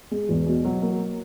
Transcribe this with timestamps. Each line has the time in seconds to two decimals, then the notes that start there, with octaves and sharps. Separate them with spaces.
0.11 G#3
0.29 E2
0.47 B2
0.65 F#3
0.82 A#3